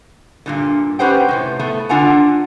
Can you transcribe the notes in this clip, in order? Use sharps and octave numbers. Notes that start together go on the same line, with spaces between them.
G2 A#2 D3
C#4 G4 B4 C5 F#5 G5
A2 C3 G#3
A3 B3
D3 D4 F4 F#5 G#5 A#5